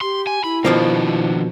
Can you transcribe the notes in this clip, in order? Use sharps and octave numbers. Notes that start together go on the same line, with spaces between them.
G4 C6
G#5
E4 B5
B2 D#3 F3 A#3 D4